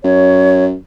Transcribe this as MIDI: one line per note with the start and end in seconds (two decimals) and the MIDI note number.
0.04 0.74 42
0.04 0.65 73